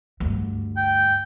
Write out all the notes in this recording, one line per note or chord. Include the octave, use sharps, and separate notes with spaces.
D2 G2
G5